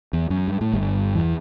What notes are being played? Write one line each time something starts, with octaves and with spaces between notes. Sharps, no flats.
E2
F#2
G2
A2
G1 G2
E2 E3